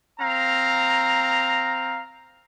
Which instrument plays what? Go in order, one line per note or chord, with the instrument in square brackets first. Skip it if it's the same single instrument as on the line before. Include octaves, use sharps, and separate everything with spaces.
[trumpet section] C4 F5 A#5